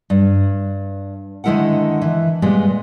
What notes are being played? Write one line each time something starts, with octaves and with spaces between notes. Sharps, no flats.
G2
D3 D#3 G#3 E4 A#4 F#5
E3
A#2 G3 G#3 B3